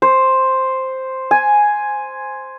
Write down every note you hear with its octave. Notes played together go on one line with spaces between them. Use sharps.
C5
G#5